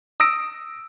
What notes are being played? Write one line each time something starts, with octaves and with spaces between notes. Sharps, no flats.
D#6 E6 A#6 D7